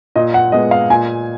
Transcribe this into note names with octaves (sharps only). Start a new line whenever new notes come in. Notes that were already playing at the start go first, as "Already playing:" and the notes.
A#2 D#5
F#5
G#3 B3 D#5
F5
A#2 G#5